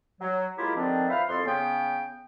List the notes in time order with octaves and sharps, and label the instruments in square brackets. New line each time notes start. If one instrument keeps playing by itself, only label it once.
[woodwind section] F#3
G#3 A#3 E4 F4 G4
D3 D#3 F3 C4 D4
F4 B4 C5 E5 F5
C2 F2 A4 C6
C#3 B3 G5